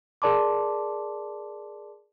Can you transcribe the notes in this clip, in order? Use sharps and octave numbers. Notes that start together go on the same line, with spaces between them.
G#4 A#4 D5 A5 C6 D6